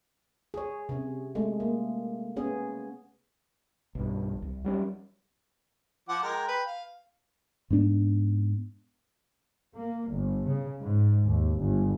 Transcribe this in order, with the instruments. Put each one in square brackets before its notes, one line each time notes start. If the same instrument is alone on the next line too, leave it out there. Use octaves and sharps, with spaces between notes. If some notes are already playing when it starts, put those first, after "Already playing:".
[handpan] G#4 C#5
C3 C#4
G#3 A3
A#3
B3 C#4 G#4
[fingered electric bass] B1 G2
C2
F#3 G3 C#4
[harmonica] F3 F#5 D6
G#3 A#4 G5
B4 G5
F5
[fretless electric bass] G#2 G#3 B3 D4
[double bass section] A#3
G1
C#3
G#2
D#2
G1